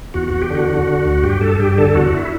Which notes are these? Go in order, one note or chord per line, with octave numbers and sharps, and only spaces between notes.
E2 F#4
F#4
E2
G4
D3 F#4
D3
D3
D2
G2 G4
G2 A4
G2 G4
D3 A4
E2 F#4
E4